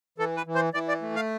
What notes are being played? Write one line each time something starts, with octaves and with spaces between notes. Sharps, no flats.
E3 A4
B4
E3
C5
E3 D5
D5
A3
F5